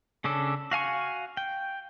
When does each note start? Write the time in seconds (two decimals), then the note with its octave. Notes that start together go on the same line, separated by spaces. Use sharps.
0.24 C#3 C#4 D4 A4
0.71 F#4 F5 G#5 C#6
1.37 G5